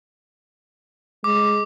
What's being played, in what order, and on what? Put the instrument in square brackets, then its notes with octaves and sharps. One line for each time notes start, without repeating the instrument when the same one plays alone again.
[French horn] G#3 [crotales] D6